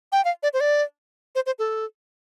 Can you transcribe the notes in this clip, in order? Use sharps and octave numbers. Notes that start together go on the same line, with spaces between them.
G5
F5
D5
C5
D5
C5
C5
A4